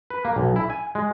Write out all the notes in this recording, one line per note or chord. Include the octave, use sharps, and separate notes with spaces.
B4
A#3
B1
E4
G#5
G#3